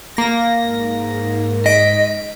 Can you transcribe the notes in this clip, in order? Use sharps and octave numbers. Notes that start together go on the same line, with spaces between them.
A#3 A#6
G#2
D#5 B6 D7